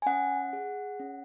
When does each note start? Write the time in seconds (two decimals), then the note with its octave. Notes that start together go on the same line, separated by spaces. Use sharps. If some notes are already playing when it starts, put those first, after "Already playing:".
0.02 G#5
0.06 C#4 F#5
0.53 G#4
0.99 C#4